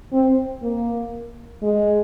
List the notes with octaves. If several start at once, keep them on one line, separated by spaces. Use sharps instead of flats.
C4
A#3
G#3